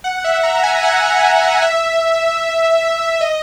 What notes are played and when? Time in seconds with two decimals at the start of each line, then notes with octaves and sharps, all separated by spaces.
0.04 F#5
0.24 E5
0.43 A#5
0.63 G#5
0.83 F#5
1.62 E5
3.21 D#5